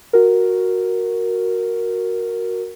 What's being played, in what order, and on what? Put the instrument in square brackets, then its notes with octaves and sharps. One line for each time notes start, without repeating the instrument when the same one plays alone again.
[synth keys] F#4 A#4